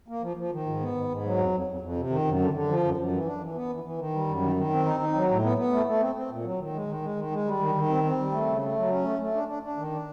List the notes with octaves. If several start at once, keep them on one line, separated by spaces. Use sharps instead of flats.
A#3
F3
F3
D#3
G#2
B3
G#2
G#2
F#3
F2
F2
F2
F2
C3
D#3
F#2
D3
D3
F3
F#2
F#2
E3
D4
E3
B3
E3
E3
D#3
G3
F#2
D#3
D#3
C4
D#4
D#4
F#3
A2
B3
B3
A3
A3
C4
C4
A#2
F#3
D#3
G#3
D#3
G#3
D#3
G#3
G3
D#3
D#3
C4
C4
G3
A3
C#3
A3
F#3
C#4
A3
A3
D4
D4
D4
D#3
D4